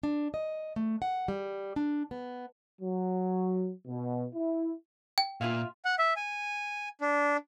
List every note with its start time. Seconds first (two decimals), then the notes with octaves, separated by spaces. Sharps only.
0.03 D4
0.34 D#5
0.76 A3
1.02 F#5
1.28 G3
1.76 D4
2.11 B3
2.81 F#3
3.86 B2
4.35 E4
5.18 G5
5.41 A#2 F4 E5 F5
5.85 F#5
5.99 E5
6.16 G#5
7.01 D4